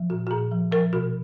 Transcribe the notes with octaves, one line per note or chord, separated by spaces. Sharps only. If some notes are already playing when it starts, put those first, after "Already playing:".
Already playing: F3
A#2 F#4
F#4
A#2 G#4
F3
F3 A#4
B2 F#4